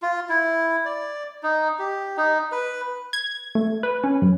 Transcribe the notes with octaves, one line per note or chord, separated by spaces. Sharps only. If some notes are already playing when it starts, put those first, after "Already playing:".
F4
E4
D5
D#4
G4
D#4
B4
G#6
A3
B4
C#4
F#2